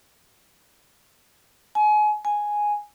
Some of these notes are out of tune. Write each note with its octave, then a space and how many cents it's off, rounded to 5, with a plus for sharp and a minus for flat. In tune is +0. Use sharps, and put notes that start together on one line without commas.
G#5 +30
G#5 +0